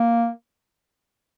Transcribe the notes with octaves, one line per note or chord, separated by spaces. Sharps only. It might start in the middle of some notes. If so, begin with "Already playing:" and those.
Already playing: A#3